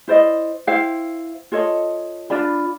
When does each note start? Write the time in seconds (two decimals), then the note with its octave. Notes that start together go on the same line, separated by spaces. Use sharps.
0.08 E4 C5 D5 D#5
0.67 E4 C5 F5 G5
1.52 F4 A4 C#5 D#5
2.30 D4 F4 D5 B5